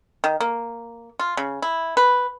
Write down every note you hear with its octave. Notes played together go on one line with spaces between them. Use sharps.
D#3
A#3
F4
C#3
E4
B4